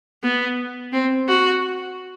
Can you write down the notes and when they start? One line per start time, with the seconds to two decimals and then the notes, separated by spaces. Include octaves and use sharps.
0.23 B3
0.93 C4
1.28 F#4